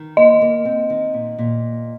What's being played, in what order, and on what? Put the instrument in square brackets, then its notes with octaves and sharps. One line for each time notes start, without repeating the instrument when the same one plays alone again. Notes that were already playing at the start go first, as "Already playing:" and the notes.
Already playing: [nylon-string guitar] D#3
[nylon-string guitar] A#3 [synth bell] D#5
[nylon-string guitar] A#3
C4
D#3
A#2
A#2